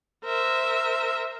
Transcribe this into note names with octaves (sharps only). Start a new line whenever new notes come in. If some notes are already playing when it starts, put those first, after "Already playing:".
A#4 C5 E5